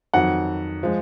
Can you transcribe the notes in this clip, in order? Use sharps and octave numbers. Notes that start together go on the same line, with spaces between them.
F2 D#3 F#3 F#5
F3 G#3